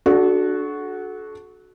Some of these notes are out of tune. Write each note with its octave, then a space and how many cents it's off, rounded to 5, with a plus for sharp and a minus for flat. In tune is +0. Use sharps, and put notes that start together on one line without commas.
D4 +0 F#4 +0 A4 -35